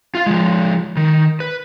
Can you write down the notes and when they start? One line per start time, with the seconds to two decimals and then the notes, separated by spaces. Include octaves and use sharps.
0.15 F4 F5
0.26 F3 G#3
0.97 D#3
1.40 B4